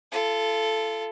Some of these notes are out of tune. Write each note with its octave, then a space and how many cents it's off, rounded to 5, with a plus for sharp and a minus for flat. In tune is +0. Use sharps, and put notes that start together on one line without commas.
F4 -30 A4 +0